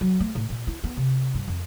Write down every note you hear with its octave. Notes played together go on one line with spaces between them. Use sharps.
F#3
A3
A2
A#2
E4
B3
C3
G2
F2